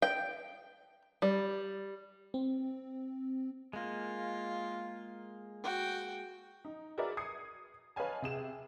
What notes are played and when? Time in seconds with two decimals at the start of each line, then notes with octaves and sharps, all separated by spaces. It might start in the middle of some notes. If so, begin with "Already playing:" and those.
0.02 G5
1.22 G3
2.34 C4
3.73 G#3 A#3 F4
5.63 F#4 G5
6.65 D#4
6.98 F#4 G#4 A#4 B4 D5 E5
7.17 D#6 G#6 C7 C#7
7.96 B4 C#5 D#5 F5 G#5 A5
8.22 C3 G#4 E7